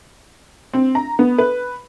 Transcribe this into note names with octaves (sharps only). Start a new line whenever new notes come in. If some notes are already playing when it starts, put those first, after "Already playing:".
C4
A#5
B3
B4